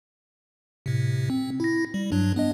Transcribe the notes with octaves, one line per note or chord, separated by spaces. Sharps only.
A2 C3
C4
E4 A#6
G3
G2 F#3 D4
B3 D4 D#5